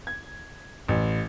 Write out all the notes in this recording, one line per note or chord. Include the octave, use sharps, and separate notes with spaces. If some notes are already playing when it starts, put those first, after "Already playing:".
G#6
A1